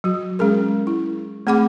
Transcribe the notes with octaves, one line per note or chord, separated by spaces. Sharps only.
F#3 F#4
G#3 C#4 G#4 A#4
E4
A3 C4 G#4 F#5 B5 D6